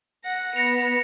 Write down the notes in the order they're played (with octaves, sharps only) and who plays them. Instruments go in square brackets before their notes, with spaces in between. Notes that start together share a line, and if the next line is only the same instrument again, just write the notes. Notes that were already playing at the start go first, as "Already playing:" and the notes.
[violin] F#5 A#6
[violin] B3 [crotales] A#6 C#7 F7